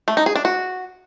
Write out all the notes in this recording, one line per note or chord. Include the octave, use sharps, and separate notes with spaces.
A3
D#4
G#4
D4
F#4